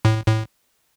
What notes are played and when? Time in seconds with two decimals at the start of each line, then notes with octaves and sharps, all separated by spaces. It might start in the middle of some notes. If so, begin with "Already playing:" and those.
0.05 A2
0.27 A2